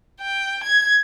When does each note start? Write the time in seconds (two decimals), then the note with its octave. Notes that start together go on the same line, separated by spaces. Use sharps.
0.22 G5
0.64 G#6